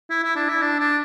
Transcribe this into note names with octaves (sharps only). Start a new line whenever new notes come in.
E4
E4
D4
E4
D4
D4